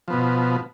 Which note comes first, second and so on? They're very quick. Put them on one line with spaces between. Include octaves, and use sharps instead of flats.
F3 B3 B2